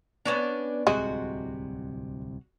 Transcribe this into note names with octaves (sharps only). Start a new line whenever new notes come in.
B3 C#4 D4
D1 C2 C3 G#3 F#4 D#5